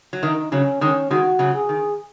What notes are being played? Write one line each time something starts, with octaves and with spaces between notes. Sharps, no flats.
F#3
D#3 D#4
C#3 F#3 C#4
D#3 G#3 C#4
D#3 G#3 F#4
C#3 F#3
G#4
D#3